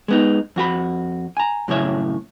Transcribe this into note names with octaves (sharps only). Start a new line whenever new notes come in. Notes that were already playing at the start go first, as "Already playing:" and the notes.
G#3 B3 D#4
F2 F#4 G#4 B5
G#5 A#5
F#2 A2 C#3 C#5 E5